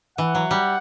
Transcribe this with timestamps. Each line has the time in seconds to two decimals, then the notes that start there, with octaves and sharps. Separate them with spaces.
0.18 E3 F#5
0.35 F#3
0.51 G3